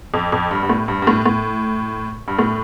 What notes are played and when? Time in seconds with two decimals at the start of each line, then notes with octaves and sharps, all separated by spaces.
0.14 F2
0.32 F2
0.51 G2
0.63 G2
0.69 A2
0.88 G2
1.02 G2
1.07 A2
1.26 A2
2.28 G2
2.39 A2